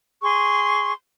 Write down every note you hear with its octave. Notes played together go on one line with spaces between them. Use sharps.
G#4 C6 C#6